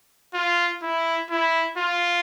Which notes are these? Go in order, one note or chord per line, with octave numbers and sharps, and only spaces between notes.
F4
E4
E4
F4